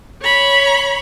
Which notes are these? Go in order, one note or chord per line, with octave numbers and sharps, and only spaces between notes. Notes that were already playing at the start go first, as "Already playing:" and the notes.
C#5 B5